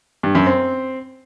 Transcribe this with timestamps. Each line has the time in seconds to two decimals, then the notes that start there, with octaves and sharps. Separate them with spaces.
0.23 G2
0.35 F#2
0.46 C4